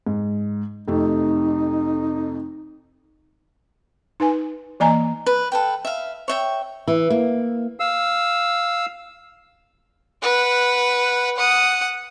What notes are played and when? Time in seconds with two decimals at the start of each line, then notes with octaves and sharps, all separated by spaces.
0.06 G#2
0.87 F2 C3 A3 D#4
4.20 D#4 B4 G#5
4.80 E3 A#3 D#5 G#5 A#5
5.26 B4
5.52 A4 B4 G5
5.85 E5 F5
6.28 C#5 E5 G5
6.88 E3
7.10 A#3
7.80 F5 E6
10.22 B4 F#5
11.37 F#5 D#6